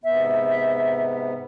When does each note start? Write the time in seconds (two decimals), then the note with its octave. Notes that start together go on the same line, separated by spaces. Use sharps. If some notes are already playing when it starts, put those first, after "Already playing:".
0.04 G#2 C3 B3 E5